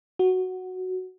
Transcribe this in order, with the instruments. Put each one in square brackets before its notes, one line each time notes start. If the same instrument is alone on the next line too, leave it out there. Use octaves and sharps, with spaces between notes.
[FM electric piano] F#4